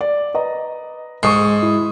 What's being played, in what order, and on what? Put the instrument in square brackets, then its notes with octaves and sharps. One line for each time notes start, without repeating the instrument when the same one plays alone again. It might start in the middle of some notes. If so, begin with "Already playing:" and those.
[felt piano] D5
B4 D#5 A#5
[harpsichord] G#2 [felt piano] C#6 D#6 C7
[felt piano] E4